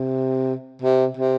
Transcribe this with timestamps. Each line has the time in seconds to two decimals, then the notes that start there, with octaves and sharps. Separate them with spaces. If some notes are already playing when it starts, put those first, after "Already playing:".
Already playing: C3
0.82 C3
1.17 C3